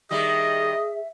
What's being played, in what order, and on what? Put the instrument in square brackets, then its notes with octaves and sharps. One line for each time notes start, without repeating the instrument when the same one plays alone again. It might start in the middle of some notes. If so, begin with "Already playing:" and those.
[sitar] D#3 G3 G4 [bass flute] G#4 [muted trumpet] D#5 [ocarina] E5